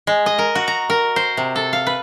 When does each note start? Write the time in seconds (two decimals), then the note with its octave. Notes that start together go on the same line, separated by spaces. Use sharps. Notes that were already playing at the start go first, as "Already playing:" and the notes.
0.07 G#3
0.26 D#5
0.38 A#4
0.55 F#4
0.68 A#5
0.90 A#4
1.16 C5
1.37 C3
1.56 A4
1.73 F5
1.87 B4